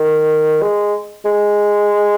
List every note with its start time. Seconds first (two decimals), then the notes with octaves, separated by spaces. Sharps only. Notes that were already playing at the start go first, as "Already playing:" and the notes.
Already playing: D#3
0.62 G#3
1.25 G#3